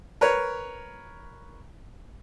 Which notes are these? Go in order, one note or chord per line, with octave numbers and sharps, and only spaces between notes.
A#4 B4 C#5